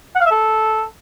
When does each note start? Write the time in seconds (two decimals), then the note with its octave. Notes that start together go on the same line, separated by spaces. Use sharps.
0.16 F#5
0.21 F5
0.26 E5
0.31 A4